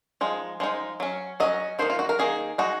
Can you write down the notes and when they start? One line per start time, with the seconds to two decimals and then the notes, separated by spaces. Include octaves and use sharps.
0.21 F3 G#3 D#4
0.60 F3 G#3 D#4
1.00 F#3 C#4
1.40 F#3 C#4 D#5
1.79 D#3 A#3 D#4 C5
1.90 F4
1.99 F#4
2.09 A#4
2.19 D#3 A#3 D#4 G#4
2.58 G#3 D#4 F#4